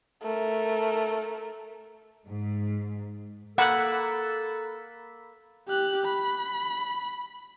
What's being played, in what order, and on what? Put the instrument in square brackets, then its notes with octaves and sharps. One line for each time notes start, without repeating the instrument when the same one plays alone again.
[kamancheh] A3 A#4
[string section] G#2
[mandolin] A#3 F#6 [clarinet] A4 [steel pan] F#5 [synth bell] A#5 B5 B6
[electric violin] G4 F#6
B5